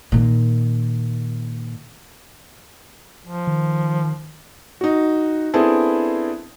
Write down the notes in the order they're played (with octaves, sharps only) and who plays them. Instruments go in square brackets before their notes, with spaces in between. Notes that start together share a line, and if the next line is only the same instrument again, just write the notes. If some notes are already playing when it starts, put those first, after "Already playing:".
[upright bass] A#2 D#3
[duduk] F3
[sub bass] D#3
[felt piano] D#4 F#4
B3 C4 D4 E4 G#4 A4